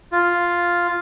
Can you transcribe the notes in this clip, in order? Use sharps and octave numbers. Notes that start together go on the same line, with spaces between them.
F4